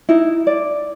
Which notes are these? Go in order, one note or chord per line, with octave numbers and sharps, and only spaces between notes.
D#4 E4
D5